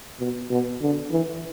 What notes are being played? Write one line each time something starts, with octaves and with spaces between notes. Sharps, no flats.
B2
B2
D3
E3